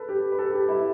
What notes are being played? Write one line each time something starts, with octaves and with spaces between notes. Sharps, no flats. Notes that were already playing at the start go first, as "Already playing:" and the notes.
Already playing: A4 B4
G4
B4
A4
G4
E4